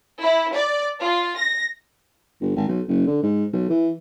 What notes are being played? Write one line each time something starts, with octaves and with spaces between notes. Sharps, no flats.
E4
D5
F4
A#6
G1
G#1
B1
F#1
D3
G#2
B1
E3